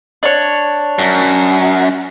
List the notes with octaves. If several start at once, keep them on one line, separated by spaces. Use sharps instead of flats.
D4 C#5
F#2